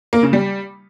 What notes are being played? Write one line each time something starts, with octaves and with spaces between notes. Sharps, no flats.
A#3
C#3
G3